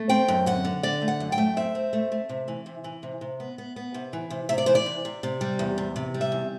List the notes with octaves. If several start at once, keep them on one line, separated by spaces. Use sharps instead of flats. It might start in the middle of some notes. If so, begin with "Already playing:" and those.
Already playing: A3
C4 G5
F#2
D3 F#5
D3
D3 D5
A3
F#5
F#2
G5
A3
C4 E5
C4
A3
A3
C3
E3
C3
E3
C3
C3
B3
B3
B3
C3
E3
C3
C3 E5
D5
E3 C5
D5
C3
C3
C3
G3
E2
C3
C3
G3
E5
E2